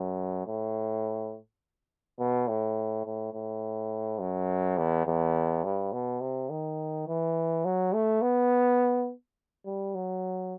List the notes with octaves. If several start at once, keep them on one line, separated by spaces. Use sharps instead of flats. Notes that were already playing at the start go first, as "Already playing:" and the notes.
Already playing: F#2
A2
B2
A2
A2
A2
F#2
E2
E2
G2
B2
C3
D#3
E3
F#3
A3
B3
G3
F#3